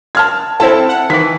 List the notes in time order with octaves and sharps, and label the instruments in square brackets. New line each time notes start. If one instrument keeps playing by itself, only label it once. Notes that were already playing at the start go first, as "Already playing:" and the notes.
[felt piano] A5 F6 G#6
[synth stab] C4 E4 A4 [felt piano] A5
[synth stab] F#5
[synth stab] D#3 E3 [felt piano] B6